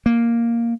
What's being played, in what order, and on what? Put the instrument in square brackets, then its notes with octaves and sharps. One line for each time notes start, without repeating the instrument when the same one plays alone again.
[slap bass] A#3